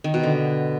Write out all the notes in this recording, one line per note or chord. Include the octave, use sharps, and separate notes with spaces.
D#3
B2
D3